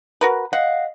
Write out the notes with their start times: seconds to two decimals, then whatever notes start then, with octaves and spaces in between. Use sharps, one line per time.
0.21 F#4 A#4 B4
0.53 D#5 F5 F#5